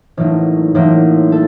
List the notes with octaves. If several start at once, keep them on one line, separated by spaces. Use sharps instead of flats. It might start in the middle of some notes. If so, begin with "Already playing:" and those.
A1 A2 F#3 A#3 D#4
A1 A2 F#3 A#3 D#4
A4